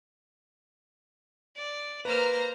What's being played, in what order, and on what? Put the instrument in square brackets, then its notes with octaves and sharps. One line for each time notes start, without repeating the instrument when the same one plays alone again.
[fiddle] D5
[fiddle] A#3 F6 [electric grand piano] B4 [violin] C5 A#5